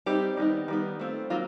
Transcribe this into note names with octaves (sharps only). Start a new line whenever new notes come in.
G3 C4 D#4 G4
D#3 G3 B3 D#4
D#3 G3 B3
A3 C4 F4
D#3 F#3 A#3 F4